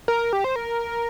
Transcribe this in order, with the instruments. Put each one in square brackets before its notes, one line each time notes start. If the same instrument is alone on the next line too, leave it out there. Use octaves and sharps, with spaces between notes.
[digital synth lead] A#4
G4
C5
A#4